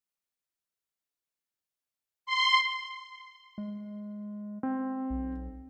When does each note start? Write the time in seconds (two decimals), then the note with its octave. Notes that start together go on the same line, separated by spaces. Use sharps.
2.26 C6
3.58 G#3
4.63 C4
5.10 B1